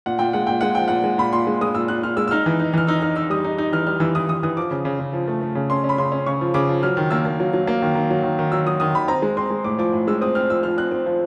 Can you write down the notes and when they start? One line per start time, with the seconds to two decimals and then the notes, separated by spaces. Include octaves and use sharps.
0.06 A#2 F#5
0.19 A#2 G5
0.33 G#3 F#5
0.47 A#2 G5
0.61 G#3 F#5
0.75 F3 G5
0.88 A#2 F#5
1.04 G#3
1.18 A#2 B5
1.33 A#2 C6
1.47 G#3
1.61 G#3 D#6
1.75 A#2 E6
1.88 A#2 F#6
2.03 A#2 F6
2.17 G#3 E6
2.28 E6
2.31 D#4 F6
2.46 E3
2.60 D#4
2.74 E3 F6
2.87 D#4 E6
3.02 D#4 F6
3.16 D#4 E6
3.30 G3 D#6
3.45 D#4
3.58 D#4
3.72 E3 F6
3.87 G3 F6
4.00 E3 E6
4.15 E3 D#6
4.29 E3 D#6
4.43 E3 D#6
4.57 F3 D6
4.71 C#3
4.85 C#3
5.00 C#3
5.13 F3
5.27 A3
5.41 A3
5.55 C#3
5.70 C#4 C6
5.84 C#4
5.89 B5
5.98 C#3 C6
6.12 C#4
6.26 C#3 C#6
6.41 F3
6.54 C#3 D6
6.69 F3
6.83 F#3 F6
6.97 D#3
7.10 A#3 E6
7.25 A#3
7.40 F#3
7.53 F#3
7.67 A#3
7.82 D#3
7.95 D#3
8.10 F#3
8.23 D#3
8.39 D#3
8.52 F#3 E6
8.67 F#3 D#6
8.80 D#3 D#6
8.95 D#3 B5
9.08 C4 A#5
9.22 G#3
9.37 C4 C6
9.50 G#3
9.64 A2 D6
9.79 F3 D6
9.93 A2
10.07 G#3 E6
10.21 C4 D#6
10.35 C4 F6
10.50 F3 E6
10.63 F3 F6
10.78 C4 F#6
10.91 C4
11.06 F3